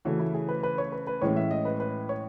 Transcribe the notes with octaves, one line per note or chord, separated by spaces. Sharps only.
C#3 E3 A3 C#4 F#4
E4
G#4
B4
B4
C#5
B4
B4
A2 E3 G#3 C#4 C#5
E5
D#5
B4
B4
C#5